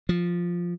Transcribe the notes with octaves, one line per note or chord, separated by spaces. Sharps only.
F3